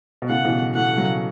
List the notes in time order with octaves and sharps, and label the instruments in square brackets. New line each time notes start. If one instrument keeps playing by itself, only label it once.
[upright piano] B2
[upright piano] A2 C#3 [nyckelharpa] F#5
[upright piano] B2 E3
[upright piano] E3 A3 [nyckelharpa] F#5
[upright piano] C#3 F#3